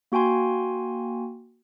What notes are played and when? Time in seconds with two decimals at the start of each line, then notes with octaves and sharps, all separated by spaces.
0.12 A#3 F#4 G5 G#5 C6